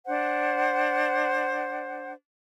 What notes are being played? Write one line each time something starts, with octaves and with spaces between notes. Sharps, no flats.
D4 C5 F#5